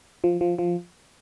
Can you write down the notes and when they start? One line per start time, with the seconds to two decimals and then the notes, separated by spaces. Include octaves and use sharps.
0.24 F3
0.41 F3
0.59 F3